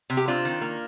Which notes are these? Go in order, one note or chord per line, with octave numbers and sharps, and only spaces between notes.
C3
G4
C4 D4 F4
D#3
A#3